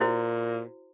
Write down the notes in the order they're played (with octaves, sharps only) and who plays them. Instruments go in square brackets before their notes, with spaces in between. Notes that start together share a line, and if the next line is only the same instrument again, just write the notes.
[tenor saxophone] A#2 [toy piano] E4 F#4 C5